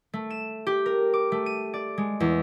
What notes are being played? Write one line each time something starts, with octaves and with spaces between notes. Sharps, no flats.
A3
E7
G4
A#4
D6
A3
D#7
D5
G#3
E2